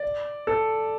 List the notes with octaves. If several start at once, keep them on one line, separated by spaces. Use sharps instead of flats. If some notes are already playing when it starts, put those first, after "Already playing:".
Already playing: D5
A4